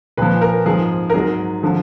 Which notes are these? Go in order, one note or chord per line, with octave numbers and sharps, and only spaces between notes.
A#2 F3 B4
A#4
G#2 F3 G#4
A#4
G#2 F#3 G#4
D3 F3